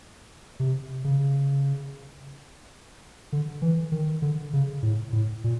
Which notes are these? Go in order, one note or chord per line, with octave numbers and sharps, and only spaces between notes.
C3
C#3
D3
E3
D#3
D3
C#3
A2
A2
A#2